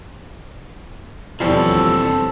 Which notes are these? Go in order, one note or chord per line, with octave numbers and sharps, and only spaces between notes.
D#2 B2 E3 F3 G3 C4 A4 C#5